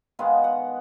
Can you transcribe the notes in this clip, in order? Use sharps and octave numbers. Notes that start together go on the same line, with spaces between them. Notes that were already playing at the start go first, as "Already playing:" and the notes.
D#3 G#3 B3 F5
F#5